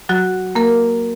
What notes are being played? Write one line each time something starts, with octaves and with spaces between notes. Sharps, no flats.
F#3 F#4
A#3 A#4